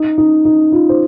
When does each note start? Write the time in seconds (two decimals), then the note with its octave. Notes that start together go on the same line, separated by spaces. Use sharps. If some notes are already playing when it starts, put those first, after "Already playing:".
Already playing: D#4
0.18 D#4
0.45 D#4
0.72 F4
0.89 C5